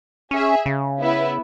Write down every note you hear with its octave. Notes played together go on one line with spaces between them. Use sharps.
C#4 G#4 E5 G#5
C#3
B3 E4 B4 E5